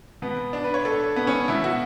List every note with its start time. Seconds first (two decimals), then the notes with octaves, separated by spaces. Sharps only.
0.22 B2 B3
0.53 D4
0.64 B4
0.74 C#5
0.85 A4
1.16 B3
1.27 C#4
1.48 B2 E4
1.64 F#4